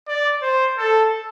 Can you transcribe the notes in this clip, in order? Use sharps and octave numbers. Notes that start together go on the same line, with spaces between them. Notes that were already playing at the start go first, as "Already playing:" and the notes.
D5
C5
A4